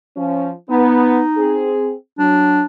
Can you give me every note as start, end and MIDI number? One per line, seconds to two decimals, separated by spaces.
0.17 0.50 53
0.17 0.50 61
0.70 1.20 59
0.70 1.75 63
1.37 1.93 60
1.37 1.93 68
2.19 2.60 54
2.19 2.64 62